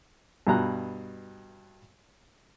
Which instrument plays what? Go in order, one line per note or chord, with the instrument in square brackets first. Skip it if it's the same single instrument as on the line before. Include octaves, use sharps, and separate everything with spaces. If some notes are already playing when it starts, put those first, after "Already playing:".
[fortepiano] G2 B2 A#5 F#6